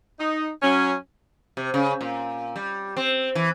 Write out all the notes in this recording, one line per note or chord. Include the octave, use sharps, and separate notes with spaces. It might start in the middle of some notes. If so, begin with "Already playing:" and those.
D#4
F#3 C#4
C3
C#3
A#2
G3
C4
E3